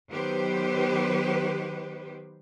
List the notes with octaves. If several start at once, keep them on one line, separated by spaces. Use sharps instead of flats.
D#3 F#3 B3 G4 B4 C5